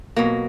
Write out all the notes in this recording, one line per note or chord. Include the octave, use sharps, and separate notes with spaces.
B2 F#3 A#3